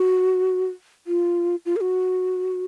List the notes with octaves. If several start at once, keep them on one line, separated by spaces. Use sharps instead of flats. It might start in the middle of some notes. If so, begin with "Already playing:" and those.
Already playing: F#4
F4
F4
A#4
F#4